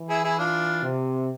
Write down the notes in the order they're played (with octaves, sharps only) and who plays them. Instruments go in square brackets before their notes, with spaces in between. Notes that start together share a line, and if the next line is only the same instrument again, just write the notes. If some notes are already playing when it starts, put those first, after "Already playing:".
Already playing: [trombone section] E3
[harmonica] E4 G#4
E4 G#4
D4 F4
[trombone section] C3